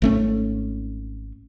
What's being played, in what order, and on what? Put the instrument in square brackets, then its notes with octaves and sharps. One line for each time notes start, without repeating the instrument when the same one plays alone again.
[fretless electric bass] G#1 A3 C#4